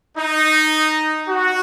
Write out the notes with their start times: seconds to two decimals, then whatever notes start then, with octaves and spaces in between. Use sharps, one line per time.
0.17 D#4
1.28 F#4